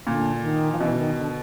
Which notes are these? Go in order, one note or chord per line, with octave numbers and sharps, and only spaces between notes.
A#2 D3
D3
D#3
F3
B2 E3
D3
D#3
D3